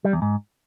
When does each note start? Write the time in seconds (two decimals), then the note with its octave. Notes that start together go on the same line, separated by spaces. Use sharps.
0.05 G3
0.13 E2
0.22 G#2